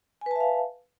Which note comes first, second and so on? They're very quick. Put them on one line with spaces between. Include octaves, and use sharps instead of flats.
G#5 B4 A5 E5 F5